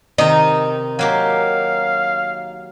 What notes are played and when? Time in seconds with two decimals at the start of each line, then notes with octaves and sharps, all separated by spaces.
0.18 C3 D#3 D#4 A#5
0.99 F#3 A#3 G4 F5